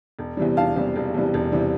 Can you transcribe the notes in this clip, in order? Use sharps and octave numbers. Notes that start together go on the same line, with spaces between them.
E1
E2 C3 E3 G3
E1 F5 A5
E2 C3 E3 G3
E1
E2 C3 E3 G3
E1
C3 E3 G3